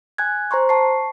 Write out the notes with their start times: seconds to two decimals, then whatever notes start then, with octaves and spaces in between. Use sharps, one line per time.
0.18 G#5 F#6 G#6
0.51 C5 A#5 C6 C#6
0.69 A5 C#6 C7